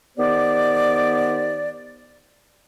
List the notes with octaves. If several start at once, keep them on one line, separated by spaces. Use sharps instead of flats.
D#3 B3 G4 C5 D5